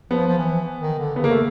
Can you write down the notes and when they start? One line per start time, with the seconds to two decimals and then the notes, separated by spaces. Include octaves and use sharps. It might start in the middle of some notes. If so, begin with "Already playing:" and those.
0.11 F3 B3
0.27 F3
0.38 E3
0.81 D#3
0.99 D3
1.16 C#3 B3
1.24 A#3
1.31 A3